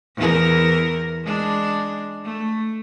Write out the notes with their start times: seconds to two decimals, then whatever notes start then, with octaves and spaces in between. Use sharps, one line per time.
0.17 E2 E4 A#4
1.24 G#3 D4
2.24 A3